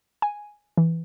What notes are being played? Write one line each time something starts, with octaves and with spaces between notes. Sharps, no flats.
G#5
E3